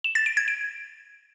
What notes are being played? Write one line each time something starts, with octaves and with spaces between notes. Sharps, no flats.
E7
A6
D7
G#6
D7